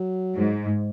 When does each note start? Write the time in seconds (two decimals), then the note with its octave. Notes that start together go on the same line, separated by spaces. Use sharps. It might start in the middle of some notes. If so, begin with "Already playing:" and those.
Already playing: F#3
0.36 G#2